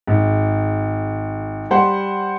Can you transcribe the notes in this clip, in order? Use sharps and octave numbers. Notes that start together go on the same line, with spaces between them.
G#1
G3 C5 F#5